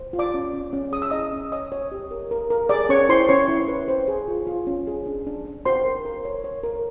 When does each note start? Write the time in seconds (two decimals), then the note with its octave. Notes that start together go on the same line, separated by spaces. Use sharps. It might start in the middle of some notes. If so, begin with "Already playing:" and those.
Already playing: C5
0.13 F4
0.19 D5 D6
0.34 C#4
0.53 C#4
0.73 C#4
0.92 G#4 D#6
1.02 E6
1.10 E4 D#5 D#6
1.33 C#4
1.52 C#5 D#5 D#6
1.72 C#5
1.92 G4
2.11 A#4
2.31 A#4
2.50 A#4
2.69 G#4 D5 D6
2.89 C#4 C#5 C#6
3.09 E4 C5 C6
3.29 C#4 C#5 C#6
3.48 E4
3.68 B4
3.88 C5
4.08 G#4
4.28 F4
4.47 F4
4.67 C#4
4.87 G#4
5.06 D4
5.27 D4
5.45 D4
5.65 F#4 C5 C6
5.85 A#4
6.05 A#4
6.25 C#5
6.44 C#5
6.63 A#4